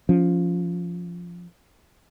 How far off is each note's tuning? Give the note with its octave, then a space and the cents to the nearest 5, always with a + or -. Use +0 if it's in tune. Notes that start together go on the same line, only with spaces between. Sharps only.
F3 +0 C#4 +15